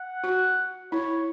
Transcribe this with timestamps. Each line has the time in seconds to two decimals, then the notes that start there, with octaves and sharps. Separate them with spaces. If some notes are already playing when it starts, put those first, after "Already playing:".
Already playing: F#5
0.24 F#4
0.92 E4 C#5